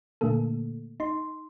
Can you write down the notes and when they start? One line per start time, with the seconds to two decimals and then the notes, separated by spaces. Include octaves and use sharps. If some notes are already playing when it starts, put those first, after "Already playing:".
0.21 A#2 D3 A3 A#3 A4
1.00 D#4 C6